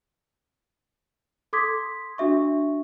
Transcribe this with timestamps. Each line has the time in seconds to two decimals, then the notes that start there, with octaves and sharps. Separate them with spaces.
1.53 A4 C6 D6 D#6 G#6 B6
2.18 D4 F#4 E5 C#6